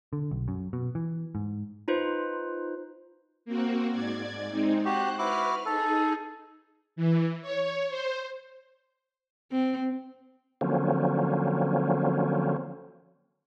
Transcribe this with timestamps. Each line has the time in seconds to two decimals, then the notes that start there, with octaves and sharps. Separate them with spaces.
0.13 D3
0.31 B1
0.48 F#2
0.73 B2
0.95 E3
1.35 G#2
1.88 D#4 F4 B4 C5
3.45 A#3 C4 F#4
3.91 G#2 D5 G#6
4.49 G#3 C4 D#4
4.85 F#4 G4 C5 F#6
5.19 E4 F#4 B4 D6 F6
5.65 D#4 G#4 A4
6.96 E3
7.42 C#5
7.89 C5
9.52 C4
10.61 D3 F3 F#3 A#3 C4 C#4